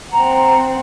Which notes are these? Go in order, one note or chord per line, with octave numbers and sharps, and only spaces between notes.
C4 F#5 A#5